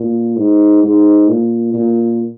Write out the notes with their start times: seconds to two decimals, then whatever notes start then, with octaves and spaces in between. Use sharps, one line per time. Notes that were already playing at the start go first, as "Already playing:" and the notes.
Already playing: A#2
0.38 G#2
0.84 G#2
1.29 A#2
1.74 A#2